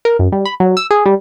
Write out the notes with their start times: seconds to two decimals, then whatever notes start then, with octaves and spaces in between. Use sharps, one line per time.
0.05 A#4
0.19 F#2
0.32 G3
0.45 B5
0.60 F#3
0.77 E6
0.91 G#4
1.06 G3